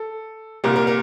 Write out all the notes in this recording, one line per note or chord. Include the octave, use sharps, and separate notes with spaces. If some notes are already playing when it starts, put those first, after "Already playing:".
Already playing: A4
C2 A#2 G3 A#3 A#4
A#4
A#4